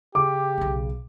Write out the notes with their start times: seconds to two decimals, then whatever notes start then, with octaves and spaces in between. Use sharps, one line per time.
0.15 C#3 G4 D6
0.58 B1 B3